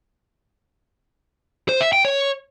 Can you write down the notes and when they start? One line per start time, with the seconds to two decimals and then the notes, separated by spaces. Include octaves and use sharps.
1.69 C5
1.81 E5
1.93 G5
2.05 C#5